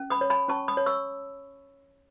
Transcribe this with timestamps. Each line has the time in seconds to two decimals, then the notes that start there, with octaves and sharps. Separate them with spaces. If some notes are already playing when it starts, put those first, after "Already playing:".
Already playing: C#4
0.10 B5 D#6
0.21 C#5
0.30 G#5 B5
0.48 C#4 A5 C#6
0.68 B5 D#6
0.77 C#5
0.86 C#6 E6